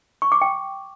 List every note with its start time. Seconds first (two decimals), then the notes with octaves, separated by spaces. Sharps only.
0.22 C#6
0.32 D6
0.41 G5